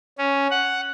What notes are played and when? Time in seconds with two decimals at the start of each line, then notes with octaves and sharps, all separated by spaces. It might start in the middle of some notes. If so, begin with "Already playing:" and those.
0.18 C#4
0.51 F#5